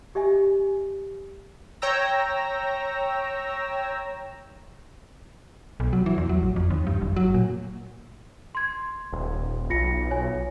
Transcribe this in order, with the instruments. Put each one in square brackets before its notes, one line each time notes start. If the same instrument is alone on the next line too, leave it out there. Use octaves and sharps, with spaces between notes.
[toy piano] G4 D#5 E5 G#5
[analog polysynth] C#5 G5 A#5 E6 A#6
[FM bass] B1
F#3
E3
E2
F#3
A1
F2
D#2
G2
F#1
F#3
A#2
[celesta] C6 G#6
[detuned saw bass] D#1
[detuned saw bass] B1 [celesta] F4 A#6 C#7
[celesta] C#5 G#5